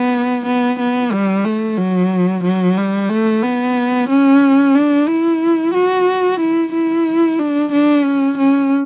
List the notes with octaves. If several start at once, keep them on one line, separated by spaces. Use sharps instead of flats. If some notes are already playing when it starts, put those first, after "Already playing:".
Already playing: B3
B3
B3
G3
A3
F#3
F#3
G3
A3
B3
C#4
D4
E4
F#4
E4
E4
D4
D4
C#4
C#4